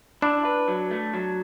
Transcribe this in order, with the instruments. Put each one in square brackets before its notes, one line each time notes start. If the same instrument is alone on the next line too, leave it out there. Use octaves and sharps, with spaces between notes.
[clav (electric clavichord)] D4 [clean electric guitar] E4
[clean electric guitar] B4
F#3
A3
F#3